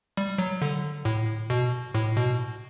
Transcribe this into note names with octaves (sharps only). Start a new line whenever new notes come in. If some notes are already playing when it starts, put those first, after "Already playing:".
G3
F#3
D3
A2
B2
A2
B2